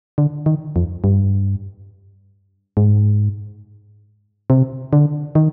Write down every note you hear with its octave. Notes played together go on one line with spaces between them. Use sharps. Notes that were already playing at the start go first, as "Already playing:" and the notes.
D3
D#3
F2
G2
G#2
C3
D3
D#3